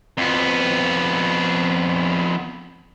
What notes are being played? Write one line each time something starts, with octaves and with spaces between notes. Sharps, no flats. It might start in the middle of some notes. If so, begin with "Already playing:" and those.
F2 B3